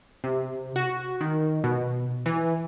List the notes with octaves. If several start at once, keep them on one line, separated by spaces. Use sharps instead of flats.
C3
F#4
D#3
B2
E3